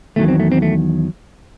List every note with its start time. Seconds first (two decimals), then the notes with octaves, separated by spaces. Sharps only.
0.16 E2 D#3 F#3 A3
0.28 C4
0.40 A3
0.52 C4
0.62 A3